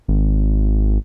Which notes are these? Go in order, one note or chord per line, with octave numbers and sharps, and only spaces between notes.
G#1